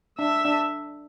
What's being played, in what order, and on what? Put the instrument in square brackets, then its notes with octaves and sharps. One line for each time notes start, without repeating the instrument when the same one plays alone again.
[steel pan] D4 [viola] E5
[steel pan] D4